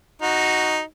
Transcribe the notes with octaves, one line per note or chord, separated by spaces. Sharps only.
D#4 F#4